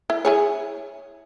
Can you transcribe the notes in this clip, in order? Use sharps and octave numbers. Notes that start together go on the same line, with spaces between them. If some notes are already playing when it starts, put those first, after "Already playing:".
E4
E4 G#4 C#5